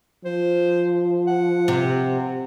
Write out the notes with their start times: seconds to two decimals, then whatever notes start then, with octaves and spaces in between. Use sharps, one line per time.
0.25 F3 C5
1.27 F#5
1.68 C3